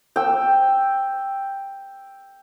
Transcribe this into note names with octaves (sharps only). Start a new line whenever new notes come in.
G5 E6